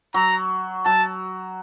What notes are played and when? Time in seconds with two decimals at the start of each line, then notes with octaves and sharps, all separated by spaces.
0.14 F#3 A#5
0.86 F#3 A5